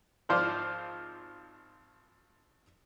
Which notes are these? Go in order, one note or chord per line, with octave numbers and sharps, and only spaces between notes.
G#1 F3 F4 C5 D5